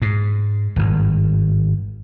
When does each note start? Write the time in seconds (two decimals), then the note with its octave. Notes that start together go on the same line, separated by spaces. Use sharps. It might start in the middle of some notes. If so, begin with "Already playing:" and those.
0.02 G#2
0.76 G#1 G2